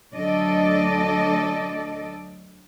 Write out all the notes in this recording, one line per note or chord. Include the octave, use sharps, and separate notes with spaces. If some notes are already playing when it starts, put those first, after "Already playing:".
D2 F#3 D4 A4 D5 D#5